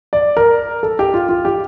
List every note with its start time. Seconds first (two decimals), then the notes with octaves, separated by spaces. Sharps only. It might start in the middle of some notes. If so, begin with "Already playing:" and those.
0.13 D5
0.37 A#4
0.83 A4
0.99 G4
1.14 F4
1.29 F4
1.45 G4